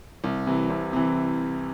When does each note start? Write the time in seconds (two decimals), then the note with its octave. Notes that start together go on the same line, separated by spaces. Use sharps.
0.24 C2
0.47 C3 E3
0.70 C2
0.93 C3 E3